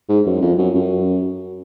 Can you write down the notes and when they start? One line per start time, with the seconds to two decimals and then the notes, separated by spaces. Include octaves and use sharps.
0.09 G#2
0.26 F#2
0.41 F2
0.58 F#2
0.75 F#2